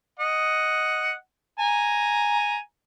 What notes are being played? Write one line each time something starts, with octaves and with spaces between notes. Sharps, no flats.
D#5 F#5
G#5 A#5